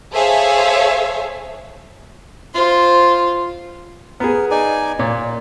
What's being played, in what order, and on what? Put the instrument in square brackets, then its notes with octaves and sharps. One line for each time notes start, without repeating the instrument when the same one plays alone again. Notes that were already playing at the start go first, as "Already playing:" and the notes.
[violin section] G#4 A4 C5 C#5 E5 F5
[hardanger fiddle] F4 C5
[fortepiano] B3 G#4 [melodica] A#4
[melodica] D#4 D5 G#5
[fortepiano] A#2 C#5 D5 [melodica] A#3